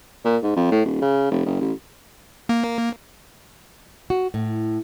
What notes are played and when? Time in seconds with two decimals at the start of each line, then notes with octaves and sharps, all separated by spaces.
0.25 A#2
0.43 G#2
0.56 F2
0.71 A2
0.85 D#1
1.02 C#3
1.31 F1
1.46 F#1
1.61 A1
2.49 A#3
4.10 F#4
4.34 A2